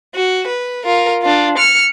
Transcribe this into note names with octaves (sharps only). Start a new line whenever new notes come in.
F#4
B4
F4 A#4
D4 F4
F6 C#7